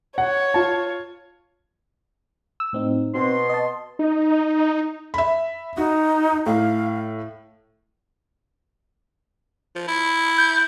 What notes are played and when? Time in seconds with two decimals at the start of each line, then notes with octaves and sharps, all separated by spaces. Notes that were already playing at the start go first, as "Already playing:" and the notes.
0.18 C#5 F#5
0.54 F4 A5
2.60 E6
2.73 A2 C4 D#4
3.14 B2 C4 C6
3.49 D#5 A5
3.99 D#4
5.14 E5 B5
5.77 D#4 F#4
6.46 A2 F5
9.75 F3
9.88 E4
10.38 G6